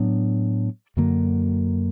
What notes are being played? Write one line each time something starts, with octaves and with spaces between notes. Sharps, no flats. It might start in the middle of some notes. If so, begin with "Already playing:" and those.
Already playing: A2 F#3 B3 D4
F#2 D3 F#3 A#3